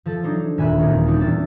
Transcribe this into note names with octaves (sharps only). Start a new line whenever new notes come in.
F3 A4
F#3 D4 D#4 C5
D#1 E5 G#5 B5 F#6
D#2 A#2 D#3 C4 C#4 D#4
G3 A#3 D4 D#4 F#4 G4
E1 E6 A6